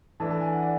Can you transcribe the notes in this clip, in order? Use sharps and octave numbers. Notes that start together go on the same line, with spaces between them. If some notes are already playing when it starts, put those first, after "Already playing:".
E3 A3 D4 A5
A5
G#5
F#5
D5